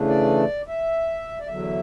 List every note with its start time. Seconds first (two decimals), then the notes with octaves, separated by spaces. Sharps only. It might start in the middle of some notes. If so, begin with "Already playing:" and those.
Already playing: C#3 E3 A3 D4
0.08 D5
0.68 E5
1.40 D5
1.47 E2 D3 F#3 E5